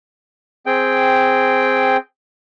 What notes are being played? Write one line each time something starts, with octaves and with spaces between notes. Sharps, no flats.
C4 G#4 G5